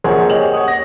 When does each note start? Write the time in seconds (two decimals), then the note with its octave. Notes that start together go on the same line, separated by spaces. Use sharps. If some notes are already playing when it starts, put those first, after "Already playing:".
0.04 A#1 G#4 A#4 C5 C#5 F#5
0.30 G4 D#5 F7 F#7
0.53 C#5 F#5 D#6
0.68 A#6